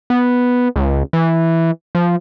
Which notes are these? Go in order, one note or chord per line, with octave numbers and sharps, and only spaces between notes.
B3
C#2
E3
F3